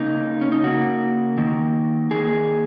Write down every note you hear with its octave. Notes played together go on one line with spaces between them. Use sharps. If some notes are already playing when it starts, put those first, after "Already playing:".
Already playing: C#3 A#3 D#4
C#4
D#4
C#3 A#3 F#4
D#3 A#3
D#3 A#3 G#4